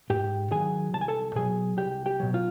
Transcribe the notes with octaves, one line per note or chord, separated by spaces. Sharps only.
G#2 G4 G5
D#3 F#3 G#4 G#5
C2 A5
G#5
A4 A5
B2 F#3 G#4 G#5
C2 G4 G5
G4 G5
B2 F#3
F4 F5